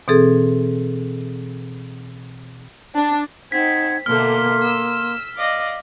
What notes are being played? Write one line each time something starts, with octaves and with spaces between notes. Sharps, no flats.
B2 E3 C4 G#4 A4
D4
C4 D#4 F#5 G#6 B6
B2 D3 A3 A#3 C6 F6
E6
D5 D#5 F5